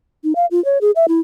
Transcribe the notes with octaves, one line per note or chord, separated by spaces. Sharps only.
D#4
F5
F4
C#5
G#4
E5
E4